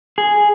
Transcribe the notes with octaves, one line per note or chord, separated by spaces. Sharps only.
G#4